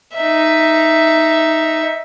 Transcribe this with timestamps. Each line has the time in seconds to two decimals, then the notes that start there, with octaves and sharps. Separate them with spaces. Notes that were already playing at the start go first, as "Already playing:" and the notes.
0.17 D#4 E5